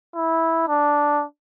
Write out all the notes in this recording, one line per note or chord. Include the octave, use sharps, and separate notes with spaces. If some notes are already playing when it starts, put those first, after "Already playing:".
E4
D4